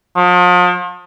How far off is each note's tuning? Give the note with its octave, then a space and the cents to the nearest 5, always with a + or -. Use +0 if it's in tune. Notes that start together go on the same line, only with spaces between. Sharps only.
F3 +40